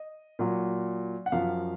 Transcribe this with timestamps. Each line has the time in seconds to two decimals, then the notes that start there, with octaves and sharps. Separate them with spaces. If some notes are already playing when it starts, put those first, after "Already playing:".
Already playing: D#5
0.39 A#2 F#3
1.26 F#5
1.32 F#2 F3 F5